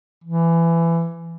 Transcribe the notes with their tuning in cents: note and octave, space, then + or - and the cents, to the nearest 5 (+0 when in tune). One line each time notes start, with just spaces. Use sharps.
E3 +20